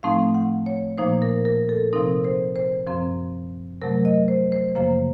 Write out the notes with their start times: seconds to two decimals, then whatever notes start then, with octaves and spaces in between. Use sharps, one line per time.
0.03 A2 F3 A3 C4 D#4 F5
0.34 F#5
0.66 C#5
0.98 A#2 F3 A#3 D#4 C5
1.22 A#4
1.45 A#4
1.69 A4
1.93 C3 F3 C4 D#4 A#4
2.24 C5
2.56 C5
2.87 F#2 F3 C4
3.82 C3 F#3 A3 A#4
4.05 D#5
4.28 C5
4.52 C5
4.75 F#2 C#3 F3 A#3 C5